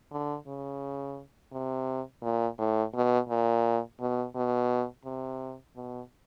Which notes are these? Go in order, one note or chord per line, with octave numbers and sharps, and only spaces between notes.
D3
C#3
C3
A#2
A2
B2
A#2
B2
B2
C3
B2